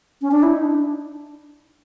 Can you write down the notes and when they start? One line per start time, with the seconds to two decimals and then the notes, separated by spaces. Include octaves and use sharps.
0.22 C#4
0.31 D4
0.43 E4
0.53 D#4
0.63 D4